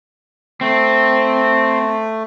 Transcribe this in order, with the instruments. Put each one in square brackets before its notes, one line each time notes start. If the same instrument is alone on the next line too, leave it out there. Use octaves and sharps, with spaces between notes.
[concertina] A3 [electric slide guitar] C4